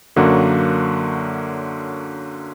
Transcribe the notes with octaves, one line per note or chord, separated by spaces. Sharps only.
F#2 D3 F#3 A#3 F#4